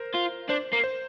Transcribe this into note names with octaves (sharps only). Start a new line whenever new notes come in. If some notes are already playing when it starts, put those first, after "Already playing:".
Already playing: A#4 C5
F4
D4 C5
A#3
C5